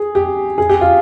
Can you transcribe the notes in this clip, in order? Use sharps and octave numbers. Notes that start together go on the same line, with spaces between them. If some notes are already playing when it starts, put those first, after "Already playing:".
Already playing: G#4
G4
G#4
G4
F4